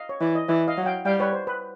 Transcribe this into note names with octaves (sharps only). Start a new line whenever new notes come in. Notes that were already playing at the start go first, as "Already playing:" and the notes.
Already playing: D#5 F5
C#5
E3 D5
D#5
E3 D5 E5
D#5 F5
F#3
F5 G5
G3 F5 G5
B4 C#5
C5
B4